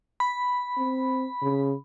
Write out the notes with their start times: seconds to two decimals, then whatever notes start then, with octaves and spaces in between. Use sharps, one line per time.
0.20 B5
0.77 C4
1.43 C#3